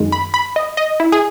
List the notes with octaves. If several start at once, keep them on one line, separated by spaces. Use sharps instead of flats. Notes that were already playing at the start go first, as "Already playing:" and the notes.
Already playing: F#2 D#3 G#3
B5
B5
D#5
D#5
E4
G#4